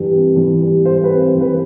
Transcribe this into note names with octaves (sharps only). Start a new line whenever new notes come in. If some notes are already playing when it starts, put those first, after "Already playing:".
Already playing: G2 E3 G3
C4
E3
G3
G2 C5
B4
C4
C5
E3
B4